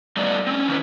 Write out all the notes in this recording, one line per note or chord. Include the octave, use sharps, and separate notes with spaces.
G3 A3 B3 D#4 A4 D5
C4 C#4
D3 D#3 F#3 C#4 E4 B4